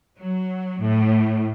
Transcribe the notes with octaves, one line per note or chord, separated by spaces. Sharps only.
F#3
A2